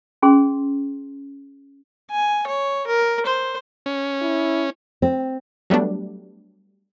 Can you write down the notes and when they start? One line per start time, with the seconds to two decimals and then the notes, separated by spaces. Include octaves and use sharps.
0.22 C#4 G#4 C6
2.11 G#5
2.47 C#5
2.87 A#4
3.26 C5
3.86 C#4
4.22 E4
5.02 C4
5.70 F#3 G3 A3 B3 D4